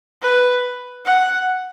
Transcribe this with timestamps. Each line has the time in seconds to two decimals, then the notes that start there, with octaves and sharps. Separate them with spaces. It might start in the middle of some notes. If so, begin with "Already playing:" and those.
0.22 B4
1.05 F#5